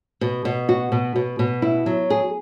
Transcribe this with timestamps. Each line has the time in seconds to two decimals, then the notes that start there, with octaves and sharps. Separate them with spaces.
0.21 B2
0.45 B2
0.69 F#4
0.92 B2
1.16 B2
1.39 B2
1.62 E4
1.86 F#3
2.10 G#4